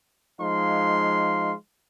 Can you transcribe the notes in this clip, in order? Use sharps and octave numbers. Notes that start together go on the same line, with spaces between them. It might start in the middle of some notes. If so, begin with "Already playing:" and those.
F3 G#3 D#4 F5 C6